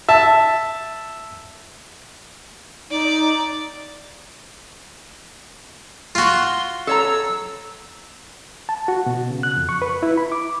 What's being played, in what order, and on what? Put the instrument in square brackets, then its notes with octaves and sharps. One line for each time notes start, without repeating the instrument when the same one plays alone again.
[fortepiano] E5 A5
[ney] D#4 [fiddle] D5
[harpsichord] F4 F#4 [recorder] C6
[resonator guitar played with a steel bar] A4 C#5 A#5 [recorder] E6
[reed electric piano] A5
F#4
B2
C#3
F#6
F2
C#6
B4
E4
B5
D6